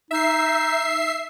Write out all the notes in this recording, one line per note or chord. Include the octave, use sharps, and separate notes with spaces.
D#4 E5 C7